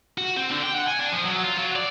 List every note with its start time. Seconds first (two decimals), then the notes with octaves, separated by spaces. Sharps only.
0.18 F#4
0.37 C4
0.51 D3
0.63 G5
0.75 F#5
0.88 G#5
1.00 D4
1.13 F3
1.26 F#3
1.43 F4
1.57 F#3
1.76 D5